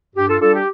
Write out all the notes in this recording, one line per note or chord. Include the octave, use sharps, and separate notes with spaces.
G2 G4
F4 A4
G3 D4 F4 A4
G4